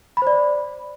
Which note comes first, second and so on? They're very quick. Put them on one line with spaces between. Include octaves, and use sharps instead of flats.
B5 C5 D5